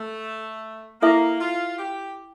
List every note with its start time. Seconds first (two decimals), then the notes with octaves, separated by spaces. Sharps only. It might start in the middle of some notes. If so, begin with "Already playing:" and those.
Already playing: A3
1.02 A#3 E4 A4 E5
1.41 F4
1.79 G4